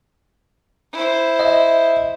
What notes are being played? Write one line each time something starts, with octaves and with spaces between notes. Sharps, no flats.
E4 C5
D#5 E5